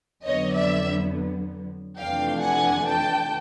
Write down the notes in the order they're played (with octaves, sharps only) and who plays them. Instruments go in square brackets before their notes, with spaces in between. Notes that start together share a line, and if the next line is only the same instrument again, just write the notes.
[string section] F2 D3 F#3 B3 C#5 D#5
D5 E5
F2 C3 E3 A3 D4 F5 G5
F#5 G#5
G5 A5